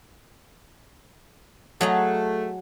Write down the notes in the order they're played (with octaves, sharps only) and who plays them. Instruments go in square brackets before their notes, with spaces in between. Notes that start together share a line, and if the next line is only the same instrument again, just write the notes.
[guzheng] F#3 D#5 A#5 [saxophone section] A3 [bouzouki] G#4 F#5 A5